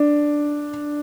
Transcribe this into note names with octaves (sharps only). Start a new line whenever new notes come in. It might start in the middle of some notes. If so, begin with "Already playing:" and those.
Already playing: D4